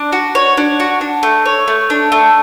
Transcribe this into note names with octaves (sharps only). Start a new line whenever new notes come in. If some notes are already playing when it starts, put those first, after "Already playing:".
Already playing: D4
F#4
C#5
D4
F#4
D4
A3
C#5
A3
D4
A3